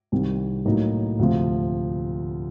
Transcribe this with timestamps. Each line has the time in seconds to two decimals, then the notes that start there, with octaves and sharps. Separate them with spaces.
0.12 C2 C3 D#3 G3 C4
0.65 A2 F#3 A#3 D#4
1.19 D2 C3 F3